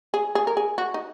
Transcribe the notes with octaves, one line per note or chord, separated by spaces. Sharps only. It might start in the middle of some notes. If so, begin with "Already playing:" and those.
G#4
G#4
A#4
G#4
F#4
D#4